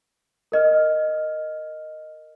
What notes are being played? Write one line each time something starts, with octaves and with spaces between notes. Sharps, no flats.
A#4 D#5 F6